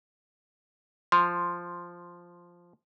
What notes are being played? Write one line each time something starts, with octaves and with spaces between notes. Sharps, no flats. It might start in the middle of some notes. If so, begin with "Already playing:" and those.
F3 C6